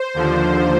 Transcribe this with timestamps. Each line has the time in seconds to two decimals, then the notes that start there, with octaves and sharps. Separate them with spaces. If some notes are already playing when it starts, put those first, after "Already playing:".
Already playing: C5
0.14 D#2 D3 F3